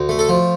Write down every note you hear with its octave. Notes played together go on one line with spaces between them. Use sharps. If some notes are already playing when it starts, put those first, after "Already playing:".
Already playing: D2
A3
A4
F3